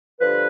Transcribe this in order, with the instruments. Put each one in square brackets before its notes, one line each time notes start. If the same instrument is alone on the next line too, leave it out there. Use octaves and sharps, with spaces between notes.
[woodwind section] G2 D3 F3 B4